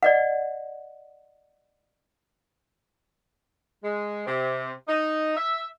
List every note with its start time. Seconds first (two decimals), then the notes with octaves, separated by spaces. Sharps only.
0.03 D5 D#5 F#5
3.83 G#3
4.26 C3
4.88 D#4
5.36 E5